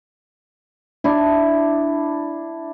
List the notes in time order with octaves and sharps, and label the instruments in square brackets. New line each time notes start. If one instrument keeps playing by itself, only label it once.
[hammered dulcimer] D4 E4